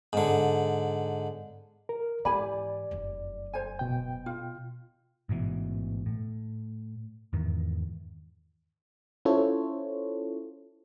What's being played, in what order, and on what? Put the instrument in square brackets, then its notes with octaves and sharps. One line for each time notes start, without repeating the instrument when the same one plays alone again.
[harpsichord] G#2 D3
[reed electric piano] A#4
[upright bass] G#2 E3 [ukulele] G4 G#5 B5 [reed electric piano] D5
[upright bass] F1 F#2
[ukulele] C5 G#5
[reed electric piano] B2 G5
[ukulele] F4
[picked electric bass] A1 G#2 B2 E3
A2
E2 G#2 D#3 E3
[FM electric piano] C#4 E4 F4 A4 C5 C#5